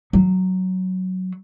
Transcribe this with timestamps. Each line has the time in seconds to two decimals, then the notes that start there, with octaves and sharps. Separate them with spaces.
0.13 F#3